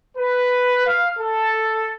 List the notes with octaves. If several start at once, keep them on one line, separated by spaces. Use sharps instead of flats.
B4
F5
A4